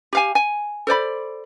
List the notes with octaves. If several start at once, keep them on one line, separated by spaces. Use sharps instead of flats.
G4 F5 G#5
G#5
A4 C5 D5 B5